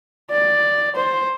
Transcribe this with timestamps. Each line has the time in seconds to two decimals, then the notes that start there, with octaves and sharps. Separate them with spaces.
0.31 D5
0.96 C5